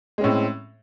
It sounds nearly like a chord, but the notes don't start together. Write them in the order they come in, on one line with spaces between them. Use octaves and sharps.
G#3 C#4 A2 C4